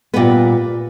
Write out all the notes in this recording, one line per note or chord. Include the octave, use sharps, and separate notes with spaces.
A#2 G3 B3 B4